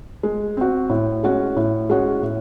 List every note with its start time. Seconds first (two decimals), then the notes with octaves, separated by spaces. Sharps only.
0.23 G#3
0.57 C4 F#4
0.89 A2
1.23 G#3 C#4 F#4
1.56 A2
1.90 G#3 C#4 F#4
2.22 A2